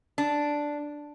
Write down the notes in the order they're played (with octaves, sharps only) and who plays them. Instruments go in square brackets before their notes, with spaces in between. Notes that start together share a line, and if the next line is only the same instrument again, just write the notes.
[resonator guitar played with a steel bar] D4